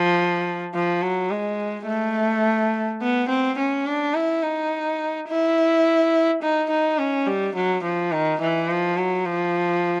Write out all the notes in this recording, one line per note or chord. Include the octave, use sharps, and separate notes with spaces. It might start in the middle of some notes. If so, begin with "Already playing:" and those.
Already playing: F3
F3
F#3
G#3
A3
B3
C4
C#4
D4
E4
D#4
E4
D#4
D#4
C#4
G3
F#3
F3
D#3
E3
F3
F#3
F3